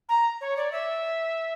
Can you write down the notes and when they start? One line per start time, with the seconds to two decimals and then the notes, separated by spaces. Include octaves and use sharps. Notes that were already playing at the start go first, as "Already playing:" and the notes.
0.09 A#5
0.41 C#5
0.57 D5
0.72 E5